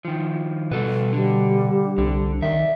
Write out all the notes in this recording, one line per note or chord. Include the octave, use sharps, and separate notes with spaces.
D#3 F3
B2 G3 A4 B4
D3 G3
C2 D3
D#3 D5 E5